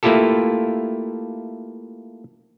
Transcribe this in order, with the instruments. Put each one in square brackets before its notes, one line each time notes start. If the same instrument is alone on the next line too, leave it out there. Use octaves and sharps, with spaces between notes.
[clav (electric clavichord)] A3 A#3 E4 F4 G4 A4